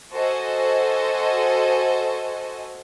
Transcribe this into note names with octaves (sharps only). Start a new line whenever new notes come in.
F#4 A4 C5 D#5 G#5